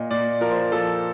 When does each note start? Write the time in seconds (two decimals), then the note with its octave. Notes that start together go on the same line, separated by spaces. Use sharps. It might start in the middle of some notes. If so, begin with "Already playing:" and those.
Already playing: A#2 D#5
0.11 A#2 D5
0.41 F3 A#4
0.51 C5
0.61 A#4
0.72 F3 A4